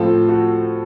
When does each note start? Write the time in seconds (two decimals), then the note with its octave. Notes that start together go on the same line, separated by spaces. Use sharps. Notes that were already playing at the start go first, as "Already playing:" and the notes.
Already playing: A2 F3 C4 F4 A4
0.28 F#4